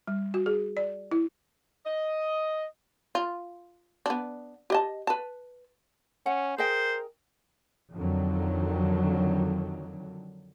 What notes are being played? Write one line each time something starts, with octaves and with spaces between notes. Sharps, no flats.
G3
F#4
G#4
D5
E4
D#5
F4
B3 D4
G4 D#5 A5
B4 A5
C#4 F#5
G#4 A#4 C5 D#5 G5
F2 D3 D#3 F#3